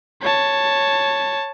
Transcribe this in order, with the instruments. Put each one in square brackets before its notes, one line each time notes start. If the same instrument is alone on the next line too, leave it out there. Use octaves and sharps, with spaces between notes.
[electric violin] C#5 A5